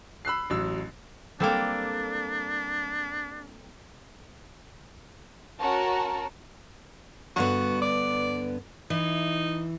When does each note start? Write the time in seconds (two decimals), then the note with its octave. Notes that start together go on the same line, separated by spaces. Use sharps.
0.25 B5 E6 F#6 C7
0.50 A1 F#3 E6
1.40 G3 A#3 C4 D4 A4 G5
5.59 C#4 F#4 A#4 A5 A#5
7.36 G2 D3 B3 F#4
7.82 D5
8.90 E3 D#4